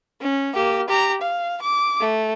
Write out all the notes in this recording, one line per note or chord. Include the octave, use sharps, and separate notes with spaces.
C#4
A#3 G4
G4 A#5
F5
D6
A3